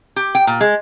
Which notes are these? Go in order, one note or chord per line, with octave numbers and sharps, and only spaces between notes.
G4
G5
A#2
G#3